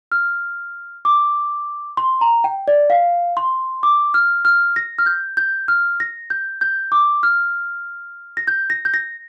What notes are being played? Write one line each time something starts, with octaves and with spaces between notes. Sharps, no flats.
F6
D6
C6
A#5
G5
D5
F5
C6
D6
F6
F6
A#6
F6
G6
G6
F6
A#6
G6
G6
D6
F6
A#6
G6
A#6
G6
A#6